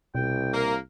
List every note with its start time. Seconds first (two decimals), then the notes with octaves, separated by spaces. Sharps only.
0.15 C2 B2 G5
0.54 A#3 A#4